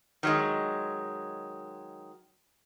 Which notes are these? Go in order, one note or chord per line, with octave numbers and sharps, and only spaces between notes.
D#3 F#3 G#3